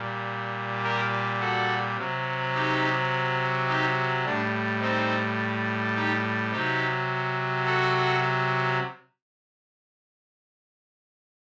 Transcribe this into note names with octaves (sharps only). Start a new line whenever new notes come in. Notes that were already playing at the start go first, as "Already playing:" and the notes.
Already playing: A#2 G3
G4 A#4
F#4 A4
C3 F#3
D#4 G4
D#4 G4
A2 G3 D4
C4 D#4
D#4 G4
C3 F#3 D#4 G4
F#4 A4